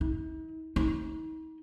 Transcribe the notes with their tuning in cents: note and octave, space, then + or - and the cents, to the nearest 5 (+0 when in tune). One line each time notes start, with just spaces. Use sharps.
D#4 +45
D#4 +40